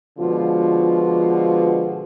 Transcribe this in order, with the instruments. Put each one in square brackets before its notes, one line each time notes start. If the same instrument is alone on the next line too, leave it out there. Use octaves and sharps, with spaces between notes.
[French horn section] B2 D3 F3 G#3 F4